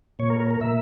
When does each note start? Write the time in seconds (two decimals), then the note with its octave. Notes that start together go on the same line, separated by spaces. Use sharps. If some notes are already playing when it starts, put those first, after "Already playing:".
0.19 A#2 C#5
0.30 A#4
0.40 A#4
0.51 A#4
0.60 A#2 E5